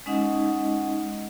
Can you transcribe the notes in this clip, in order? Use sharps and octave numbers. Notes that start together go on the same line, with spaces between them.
G#3 C#4 D#4 D#5 F#5